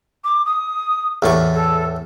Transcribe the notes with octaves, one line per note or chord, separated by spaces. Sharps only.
D6
D#6
E2 A2 G4 C#6
A4